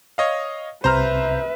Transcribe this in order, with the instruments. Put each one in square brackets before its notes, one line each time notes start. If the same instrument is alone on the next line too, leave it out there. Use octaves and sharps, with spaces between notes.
[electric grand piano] C#5 D#5 F5
[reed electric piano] C2 C3 G6 [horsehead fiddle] B4 E5 [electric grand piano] C5 A#5 F6